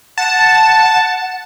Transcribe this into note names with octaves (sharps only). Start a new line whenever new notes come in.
F#5 A5